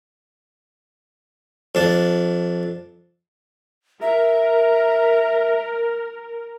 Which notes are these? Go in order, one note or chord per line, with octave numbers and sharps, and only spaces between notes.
F2 D4
A#4 E5